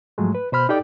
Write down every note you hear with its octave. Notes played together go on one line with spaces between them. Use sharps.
G#2 F3 F#3 G#3 A3
B4
B2 C5 B5 F6
D#4 G4 A4 D5 G5 D6